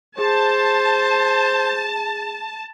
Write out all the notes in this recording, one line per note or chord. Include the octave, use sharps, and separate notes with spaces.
G#4 C5 A5